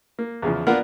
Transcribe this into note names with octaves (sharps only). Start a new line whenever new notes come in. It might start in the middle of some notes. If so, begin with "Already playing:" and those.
A#3
E2 C#3 F3
A#3 B3 D4 F4 A#4 F#5